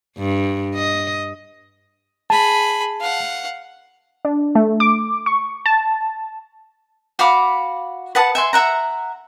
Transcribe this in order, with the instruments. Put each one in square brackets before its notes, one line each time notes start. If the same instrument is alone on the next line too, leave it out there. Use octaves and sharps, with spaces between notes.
[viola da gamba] G2
D#5
[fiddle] G#4 B5 [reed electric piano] A5
[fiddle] F5 F#5
[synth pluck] D4
A3
D6
C#6
A5
[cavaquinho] F#4 F5 B5 D6
B4 F#5 A5 D#6
E5 G#5 C6
E5 F#5 A#5